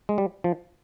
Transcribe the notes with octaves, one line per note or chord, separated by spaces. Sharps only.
G#3
G3
F3